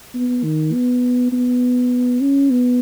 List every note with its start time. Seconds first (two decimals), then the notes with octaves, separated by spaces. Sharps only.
0.15 B3
0.44 D#3
0.73 B3
1.32 B3
2.21 C#4
2.51 B3